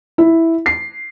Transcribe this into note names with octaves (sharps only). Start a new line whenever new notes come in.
E4
C7